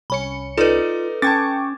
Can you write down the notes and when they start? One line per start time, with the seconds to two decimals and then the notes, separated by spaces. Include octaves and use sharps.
0.10 C2 C#4 B5 C#7
0.57 D#4 F4 A4 B4 D5 E7
1.22 C#4 G5 A5 C#6 D6 G#6 A6